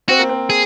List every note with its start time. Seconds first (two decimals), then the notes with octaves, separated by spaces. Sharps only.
0.09 C4 F#4
0.19 A#3
0.29 C4
0.50 G#4